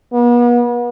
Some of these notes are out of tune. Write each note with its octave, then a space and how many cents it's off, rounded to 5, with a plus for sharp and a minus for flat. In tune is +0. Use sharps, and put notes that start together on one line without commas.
B3 -40